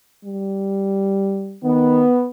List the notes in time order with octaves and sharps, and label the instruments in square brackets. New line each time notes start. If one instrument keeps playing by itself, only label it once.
[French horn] G3
[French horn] D#3 [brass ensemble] B3